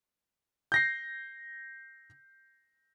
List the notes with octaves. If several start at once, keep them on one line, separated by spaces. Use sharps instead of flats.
G6 A#6 C7